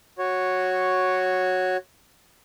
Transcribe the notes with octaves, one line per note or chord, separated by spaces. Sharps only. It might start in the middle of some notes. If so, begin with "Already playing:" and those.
F#4 C#5